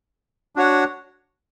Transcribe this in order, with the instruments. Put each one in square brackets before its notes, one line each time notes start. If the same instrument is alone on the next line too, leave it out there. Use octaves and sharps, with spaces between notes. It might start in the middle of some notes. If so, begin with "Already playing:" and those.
[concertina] D4 F#4 C#5 F#5